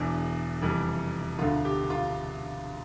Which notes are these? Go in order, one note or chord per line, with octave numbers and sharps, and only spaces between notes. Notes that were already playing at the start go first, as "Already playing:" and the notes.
Already playing: E1 E2 E3 D4
F1 F2 E3 G3
E1 D2 D3 F4
G4
F4